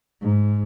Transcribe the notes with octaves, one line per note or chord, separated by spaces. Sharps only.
G#2